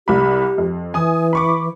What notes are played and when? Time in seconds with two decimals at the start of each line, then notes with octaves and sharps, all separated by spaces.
0.08 C2 G4 B5
0.58 F2
0.94 E3 G#5 D#6
1.33 B5 C#6 D6